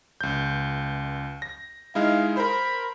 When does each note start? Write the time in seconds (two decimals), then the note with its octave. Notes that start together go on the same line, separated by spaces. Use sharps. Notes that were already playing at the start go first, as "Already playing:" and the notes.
0.21 C#2 G6
1.42 A#6
1.95 G#3 D#4 E4 F5
2.37 A#4 C5 B5